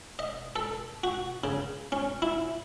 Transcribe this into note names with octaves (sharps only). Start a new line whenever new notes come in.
D#5
A4
F#4
C#3
C#4
E4